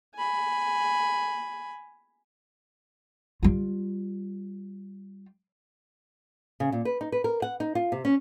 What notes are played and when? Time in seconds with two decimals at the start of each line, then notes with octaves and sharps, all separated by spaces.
0.15 G#5 B5
3.43 G3 F4
6.60 C#3
6.72 A#2
6.85 B4
7.01 D#4
7.12 B4
7.24 A#4
7.42 F#5
7.60 D#4
7.75 F4
7.92 C3
8.05 C#4